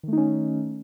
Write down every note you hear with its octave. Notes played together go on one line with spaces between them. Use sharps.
D#3 A3 C#4 D#4